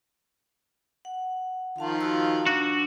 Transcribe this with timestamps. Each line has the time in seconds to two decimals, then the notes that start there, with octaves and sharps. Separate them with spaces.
1.05 F#5
1.78 D#3 F3 F4 F5 A5
2.01 F#4 E6
2.47 D4 F#4